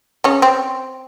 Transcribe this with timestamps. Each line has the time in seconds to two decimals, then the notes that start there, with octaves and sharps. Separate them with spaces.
0.24 C#3 C#4
0.42 C4